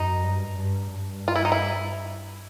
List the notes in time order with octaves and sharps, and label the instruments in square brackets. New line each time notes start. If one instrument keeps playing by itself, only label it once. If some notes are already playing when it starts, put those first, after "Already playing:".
Already playing: [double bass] F#2 [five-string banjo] D#4
[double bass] G2
G2
G2
[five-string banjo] F4
E4
D#4
E4